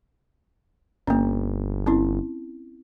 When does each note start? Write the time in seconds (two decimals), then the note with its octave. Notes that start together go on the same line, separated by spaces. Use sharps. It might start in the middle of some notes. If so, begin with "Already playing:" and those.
1.07 G1 A#3 C#4
1.86 C4 C#4 E4